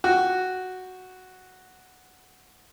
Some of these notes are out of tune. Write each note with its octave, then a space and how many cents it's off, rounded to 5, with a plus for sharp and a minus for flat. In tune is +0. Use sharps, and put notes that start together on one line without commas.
F#4 +0 G5 +0